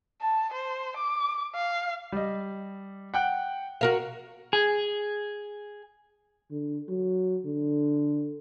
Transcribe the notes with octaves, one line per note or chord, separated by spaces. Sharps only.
A5
C5
D6
F5
G3 D#5
F#5 G5 F#6
F#4 A#4 F5
G#4
D3
F#3
D3